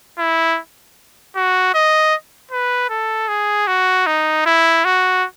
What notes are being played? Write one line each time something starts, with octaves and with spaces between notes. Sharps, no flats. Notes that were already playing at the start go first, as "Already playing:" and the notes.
E4
F#4
D#5
B4
A4
G#4
F#4
D#4
E4
F#4